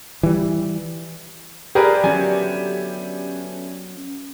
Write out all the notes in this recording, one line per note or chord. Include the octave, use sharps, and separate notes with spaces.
E3 G3
F3 G3 D4 G4 G#4 A#4 B4
D3 F#3 A3 B3 C#4 F#4 G#5